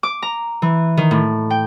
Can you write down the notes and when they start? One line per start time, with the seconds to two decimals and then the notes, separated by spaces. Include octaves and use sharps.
0.03 D6
0.22 A#5
0.62 E3
0.97 D#3
1.11 A2
1.50 G5